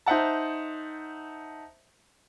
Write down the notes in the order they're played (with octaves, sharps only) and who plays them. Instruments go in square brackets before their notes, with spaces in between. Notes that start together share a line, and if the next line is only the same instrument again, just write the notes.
[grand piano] D#4 C5 E5 F#5 A5